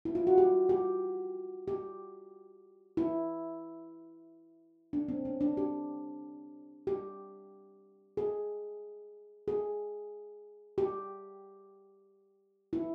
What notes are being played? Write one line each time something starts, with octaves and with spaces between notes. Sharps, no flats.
E4
F4
F#4
G4
G4
G4
E4
D4
C4
C#4
D4
G4
G4
G#4
G#4
G4
E4